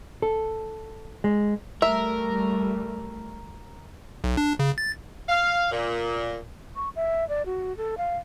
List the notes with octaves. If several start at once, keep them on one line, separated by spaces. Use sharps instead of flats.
A4
G#3
G3 A3 A#4 E5
B1
D4
C#3
A6
F5
A#2
C#6
E5
D5
F#4
A4
F5